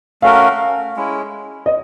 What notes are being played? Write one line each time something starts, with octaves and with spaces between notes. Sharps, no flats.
A3 C#4 F#4 A#4 F5
G#3 C#4 E4
D#5